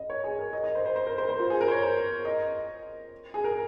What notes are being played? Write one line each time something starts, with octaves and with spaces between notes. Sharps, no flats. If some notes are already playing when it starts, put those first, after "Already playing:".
Already playing: D#5
C#5
G#4
A#4
D#5
D#5
C5
C5
C5
A#4
C5
C5
F4
G#4
A#4
C5
C#5
D#5
G#4
A#4